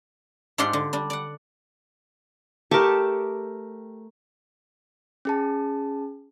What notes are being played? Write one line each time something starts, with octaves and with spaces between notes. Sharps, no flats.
G#2 D4 F4 G4 F#5 C6
D3
G3 D4
D5 F#5
A3 G4 A#4 A5 C#6
C#4 G#4 A5